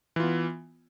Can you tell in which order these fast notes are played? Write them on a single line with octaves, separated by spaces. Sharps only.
E3 F4 B3